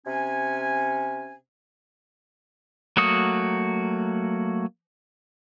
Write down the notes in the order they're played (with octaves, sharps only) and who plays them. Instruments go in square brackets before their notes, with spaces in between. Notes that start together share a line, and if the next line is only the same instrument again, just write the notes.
[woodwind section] C3 C#4 G#5
[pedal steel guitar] F#3 A3 A#3 F#4 D#6